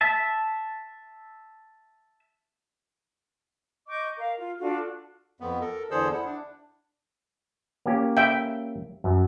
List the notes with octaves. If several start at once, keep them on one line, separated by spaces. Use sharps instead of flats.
E5 A5
D#5 C#6 D6 G6
A#4 F5
F4
D4 F4 F#4 A4
F2 B3
A4 A#4
E2 D3 G#4 A4 C5 E6
E4 F#5
D4
A#3 C#4 G4
E5 G5
F#2